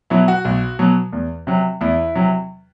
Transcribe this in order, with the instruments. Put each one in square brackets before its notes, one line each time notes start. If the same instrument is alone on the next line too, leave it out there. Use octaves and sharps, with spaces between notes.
[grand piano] B2 F#3 E4
F#4
B1
B2 F#3
E2
C3 F#3
E2 E4
C3 F#3